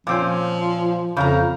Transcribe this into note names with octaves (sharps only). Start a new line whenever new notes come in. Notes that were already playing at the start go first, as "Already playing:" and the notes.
A#2 F3 C4 C#4
F2 C#3 F5 A#5